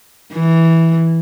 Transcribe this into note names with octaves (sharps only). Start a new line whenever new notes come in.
E3